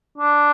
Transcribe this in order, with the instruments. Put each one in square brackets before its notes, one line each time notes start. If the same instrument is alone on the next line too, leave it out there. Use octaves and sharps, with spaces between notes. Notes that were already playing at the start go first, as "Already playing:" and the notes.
[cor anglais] D4